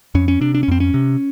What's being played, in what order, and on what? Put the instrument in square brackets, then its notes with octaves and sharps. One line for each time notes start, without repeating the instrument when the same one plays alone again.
[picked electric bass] F2 C#4
C#4
C3 D4
D4
C#4
F2 C4
C#4
C3